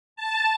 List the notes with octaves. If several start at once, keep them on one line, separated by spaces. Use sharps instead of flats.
A5